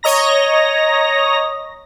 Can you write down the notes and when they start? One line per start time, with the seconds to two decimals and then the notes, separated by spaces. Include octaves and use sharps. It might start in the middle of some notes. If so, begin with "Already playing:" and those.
0.03 C#5 D#5 A#5 A#6